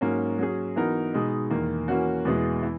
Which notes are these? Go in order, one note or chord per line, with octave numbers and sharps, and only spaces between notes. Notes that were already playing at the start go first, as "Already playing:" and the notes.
G#2 F#3 A#3 C#4
F#3 C#4 G#4
E3 B3 D#4 F#4 A#4
B2 G#3 D#4
E2 D#3 A#3
E3 A#3 C#4 F#4
E2 B2 G#3 B3 E4
E3